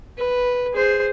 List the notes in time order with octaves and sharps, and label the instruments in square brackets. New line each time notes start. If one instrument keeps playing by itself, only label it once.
[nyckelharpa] B4
G#4 C5